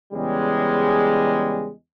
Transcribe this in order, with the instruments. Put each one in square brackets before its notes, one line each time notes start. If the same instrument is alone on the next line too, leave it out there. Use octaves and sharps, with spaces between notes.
[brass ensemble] E2 C#3 G3 G#3